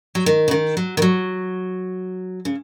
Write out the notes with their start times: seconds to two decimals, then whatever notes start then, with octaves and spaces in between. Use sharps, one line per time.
0.15 F#3
0.26 D#3
0.48 C#3
0.51 D#3
0.77 F#3
0.97 D#3
1.02 F#3
2.45 C#3